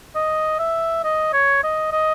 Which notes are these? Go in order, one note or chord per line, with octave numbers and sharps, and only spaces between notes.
D#5
E5
D#5
C#5
D#5
D#5